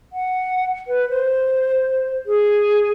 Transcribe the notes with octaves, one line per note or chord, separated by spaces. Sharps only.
F#5
B4
C5
G#4